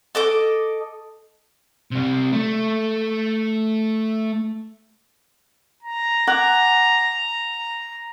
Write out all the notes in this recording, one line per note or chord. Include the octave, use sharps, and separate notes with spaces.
A4 D#5 D6
C3 G3
A3
A#5
F#5 G#5 D6